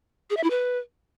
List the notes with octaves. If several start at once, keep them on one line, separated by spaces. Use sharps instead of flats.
G#4
E5
E4
B4